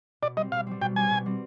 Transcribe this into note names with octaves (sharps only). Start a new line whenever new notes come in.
B2 D5
G3 C4 D#5
B2 F5
G3 C4
B2 G5
G3 C4 G#5
B2
G3 C4